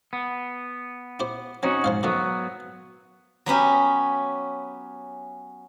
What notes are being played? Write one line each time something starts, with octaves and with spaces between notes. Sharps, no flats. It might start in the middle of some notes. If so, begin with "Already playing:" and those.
B3
E4 G4 C5
F#3 C4 C#4 D#4 F#4
G#2 F3 C5 F5
D#3 F3 F#3 A3 B3
F#3 B3 C#4 G4